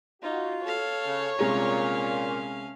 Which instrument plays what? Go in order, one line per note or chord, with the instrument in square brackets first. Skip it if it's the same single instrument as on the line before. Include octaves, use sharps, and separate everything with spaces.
[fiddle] D#4 [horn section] F4 F#4
[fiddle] A4 F5 [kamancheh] C#5
[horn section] C#3
[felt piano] C2 G#3 A#5 [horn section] A#2 [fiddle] C#4 F5